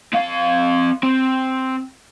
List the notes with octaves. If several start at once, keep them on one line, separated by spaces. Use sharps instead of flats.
C4 F5
C4